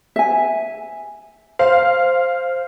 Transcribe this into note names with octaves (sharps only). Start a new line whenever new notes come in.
E5 G#5
C5 F5